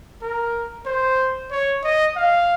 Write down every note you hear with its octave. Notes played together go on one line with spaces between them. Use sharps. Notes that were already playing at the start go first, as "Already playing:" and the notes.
A#4
C5
C#5
D#5
F5